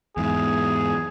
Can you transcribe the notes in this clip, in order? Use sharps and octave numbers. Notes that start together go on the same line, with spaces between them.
E2 G#2 G#4